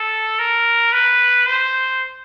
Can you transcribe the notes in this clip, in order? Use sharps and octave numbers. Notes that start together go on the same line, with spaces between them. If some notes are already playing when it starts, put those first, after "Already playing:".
Already playing: A4
A#4
B4
C5